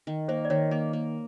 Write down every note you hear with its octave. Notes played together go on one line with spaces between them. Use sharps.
D#3
A#3 C5
D5
D#3 C#5
A#3 D#5
A#3